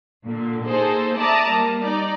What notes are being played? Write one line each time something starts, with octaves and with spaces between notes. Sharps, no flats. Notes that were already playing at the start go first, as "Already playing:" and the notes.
A#2 D3
A#3 D#4 G#4 A4 C5
D5 E5 A5 A#5 D6 D#6
G3 A#3
D#4 D5 A#5